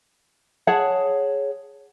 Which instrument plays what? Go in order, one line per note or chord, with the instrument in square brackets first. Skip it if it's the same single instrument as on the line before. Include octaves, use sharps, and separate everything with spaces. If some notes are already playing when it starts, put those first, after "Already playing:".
[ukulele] G#4 C#5 F#5 A5